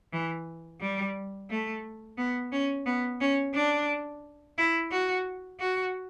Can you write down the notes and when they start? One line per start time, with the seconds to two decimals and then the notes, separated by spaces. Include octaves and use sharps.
0.13 E3
0.81 G3
1.50 A3
2.18 B3
2.52 C#4
2.86 B3
3.21 C#4
3.55 D4
4.58 E4
4.92 F#4
5.60 F#4